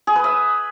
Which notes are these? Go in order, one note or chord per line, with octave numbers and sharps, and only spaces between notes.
G#4
B4
E5